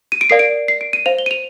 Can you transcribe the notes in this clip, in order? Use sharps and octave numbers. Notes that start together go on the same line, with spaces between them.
D#7
D7
A#4 D5 F5 C7
D7
C7
D7
D#7
C5 F5 F7
G7
D#7
F7